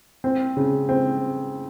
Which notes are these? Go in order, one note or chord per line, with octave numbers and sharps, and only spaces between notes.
C4
C#3
C4